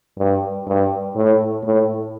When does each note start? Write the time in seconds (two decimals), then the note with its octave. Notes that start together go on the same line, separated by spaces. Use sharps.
0.18 G2
0.67 G2
1.15 A2
1.63 A2